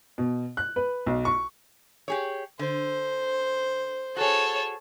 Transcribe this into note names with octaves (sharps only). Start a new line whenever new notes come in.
B2
F#6
B4
B1
C#6
G4 G#4 C#5
D3 C5
F#4 G#4 A4 C#5